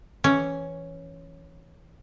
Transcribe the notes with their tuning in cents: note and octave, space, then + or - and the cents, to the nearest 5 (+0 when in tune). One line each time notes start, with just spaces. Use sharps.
E3 +0 C#4 +0